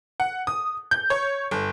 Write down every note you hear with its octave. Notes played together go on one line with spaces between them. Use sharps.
F#5
D#6
G6
C#5
G1